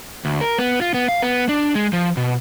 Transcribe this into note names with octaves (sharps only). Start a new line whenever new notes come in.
D2
A#4
B3
F4
B3
F5
B3
D4
G#3
F3
B2